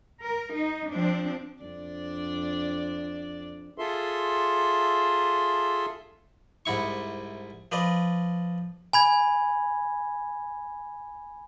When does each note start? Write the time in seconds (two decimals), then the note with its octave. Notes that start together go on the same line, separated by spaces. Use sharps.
0.23 A#4
0.56 D#4
0.92 F3 C4 D4
1.61 F2 D4 D5
3.78 F4 G#4 A4 E5 C6
6.66 C2 G#2 E4 C#6
7.72 F3 B4 D5 D#5
8.93 G#5 B5 G#6